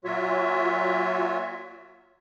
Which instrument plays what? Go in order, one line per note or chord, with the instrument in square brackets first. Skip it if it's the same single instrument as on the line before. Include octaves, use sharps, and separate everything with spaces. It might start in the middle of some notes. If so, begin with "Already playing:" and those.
[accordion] A#2 F#3 F4 F#4 C#5 E5